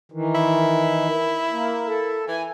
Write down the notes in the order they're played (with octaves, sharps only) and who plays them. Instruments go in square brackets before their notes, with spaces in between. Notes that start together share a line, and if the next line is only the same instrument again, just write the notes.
[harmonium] D#3 E3
[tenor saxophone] E4
[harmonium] A#3
A4
[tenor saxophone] E3 [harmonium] G#5